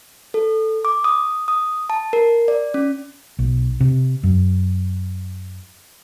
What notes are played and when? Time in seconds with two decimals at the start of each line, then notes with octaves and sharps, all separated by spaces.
0.34 A4
0.85 D6
1.04 D#6
1.48 D#6
1.90 A5
2.13 A#4
2.48 D5
2.74 C#4
3.39 B1
3.80 C3
4.23 F#2